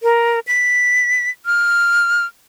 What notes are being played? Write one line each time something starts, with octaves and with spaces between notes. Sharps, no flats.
A#4
B6
F6